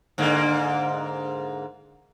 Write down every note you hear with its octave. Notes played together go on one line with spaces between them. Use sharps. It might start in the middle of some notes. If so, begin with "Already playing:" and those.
G#2 D3 A#3